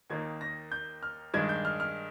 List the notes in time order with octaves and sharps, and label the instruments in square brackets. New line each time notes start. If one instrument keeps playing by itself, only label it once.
[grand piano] D#2 D#3 A#3 D#4 G#6
A#6
G6
F6
G2 D#3 G#3 D4 G#6
G6
F6
F6